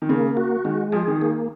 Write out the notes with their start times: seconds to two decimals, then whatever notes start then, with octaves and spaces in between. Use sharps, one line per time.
0.02 D#3
0.09 C#3 A#3
0.37 F#4
0.65 D#3 G#3
0.92 F3 G#4
1.08 D#3
1.22 A#3